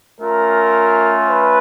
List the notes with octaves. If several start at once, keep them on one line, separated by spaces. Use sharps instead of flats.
A3 C#4 F4 A#4
B4